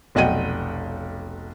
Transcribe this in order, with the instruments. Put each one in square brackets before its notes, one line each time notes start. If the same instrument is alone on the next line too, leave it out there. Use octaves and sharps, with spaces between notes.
[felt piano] F1 B1 D#5 F#5 G5 D#7